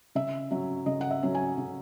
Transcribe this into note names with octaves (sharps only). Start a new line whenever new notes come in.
C#3 E5
F#3 C#4 E5
C#3 D#5
F#5
E5
F#3 C#4
G#5
C#3